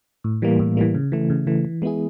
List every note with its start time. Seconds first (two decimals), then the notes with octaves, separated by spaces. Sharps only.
0.24 A2
0.42 E3 G3 A#3
0.60 A2
0.77 E3 G3 A#3
0.95 C#3
1.12 E3 A3
1.30 C#3
1.47 E3 A3
1.65 E3
1.82 G#3 B3 E4 G#4